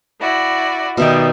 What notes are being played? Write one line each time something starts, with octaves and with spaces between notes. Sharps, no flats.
E4 F#4 D5
B2 D#3 D#4 G4 D5 E5